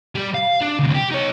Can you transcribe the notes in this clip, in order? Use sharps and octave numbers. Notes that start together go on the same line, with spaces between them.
G3 G4
F5
D4
D2 C3
G4
D#4 C#5